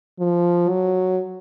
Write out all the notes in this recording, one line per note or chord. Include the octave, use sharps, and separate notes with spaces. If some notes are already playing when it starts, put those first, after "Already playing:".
F3
F#3